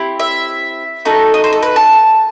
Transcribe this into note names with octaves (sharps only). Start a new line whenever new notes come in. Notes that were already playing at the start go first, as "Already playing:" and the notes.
Already playing: C4 E4 G4
E5
A3 D#4 F#4 A4
D#5
C5
A4
B4
A5